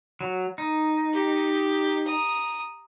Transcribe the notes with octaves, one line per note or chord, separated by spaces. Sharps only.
F#3
D#4
G4
A#5 D#6